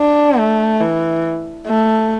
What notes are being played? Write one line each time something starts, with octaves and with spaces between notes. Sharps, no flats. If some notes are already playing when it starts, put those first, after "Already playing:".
Already playing: D4
A3
E3
A3